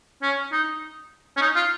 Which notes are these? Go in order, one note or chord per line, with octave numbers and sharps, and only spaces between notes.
C#4
D#4
C#4
D#4
F4